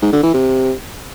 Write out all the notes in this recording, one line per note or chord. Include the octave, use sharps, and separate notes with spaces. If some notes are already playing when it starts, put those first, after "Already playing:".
G#2
D3
E3
C3